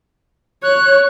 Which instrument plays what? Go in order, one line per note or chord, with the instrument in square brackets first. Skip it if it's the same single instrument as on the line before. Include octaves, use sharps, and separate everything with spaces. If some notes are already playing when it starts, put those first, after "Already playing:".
[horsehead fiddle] C#5 [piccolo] F#6